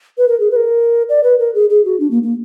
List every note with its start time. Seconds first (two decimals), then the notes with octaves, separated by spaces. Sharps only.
0.18 B4
0.28 A#4
0.40 G#4
0.51 B4
0.56 A#4
1.09 D5
1.23 B4
1.39 A#4
1.55 G#4
1.70 G#4
1.85 F#4
2.00 D4
2.11 A#3
2.23 A#3